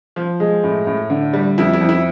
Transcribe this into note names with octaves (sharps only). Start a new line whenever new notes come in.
F3
G#3
A2
A2
D3
G3
F2 E4
E4
F2
E4